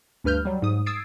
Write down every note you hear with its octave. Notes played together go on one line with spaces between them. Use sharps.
D2 G2 B4 F6 G6
F#3 G3
G#2 D#6
D#6 E6 G#6 A6 C7 D7